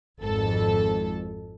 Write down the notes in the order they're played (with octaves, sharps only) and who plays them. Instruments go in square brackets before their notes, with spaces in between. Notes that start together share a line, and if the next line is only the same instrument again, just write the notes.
[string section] G#1 F2 A4